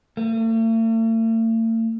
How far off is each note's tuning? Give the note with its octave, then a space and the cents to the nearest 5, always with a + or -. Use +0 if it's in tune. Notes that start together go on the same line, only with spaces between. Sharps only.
A3 +45